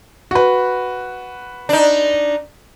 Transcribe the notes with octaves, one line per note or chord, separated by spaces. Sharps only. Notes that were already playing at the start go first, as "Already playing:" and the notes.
F#4 B4
D4 D#4